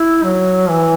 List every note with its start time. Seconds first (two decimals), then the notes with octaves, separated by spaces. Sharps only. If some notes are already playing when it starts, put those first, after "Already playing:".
Already playing: E4
0.23 F#3
0.69 E3